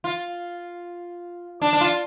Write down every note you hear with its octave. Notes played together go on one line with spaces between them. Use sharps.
F4
D4
D4
F4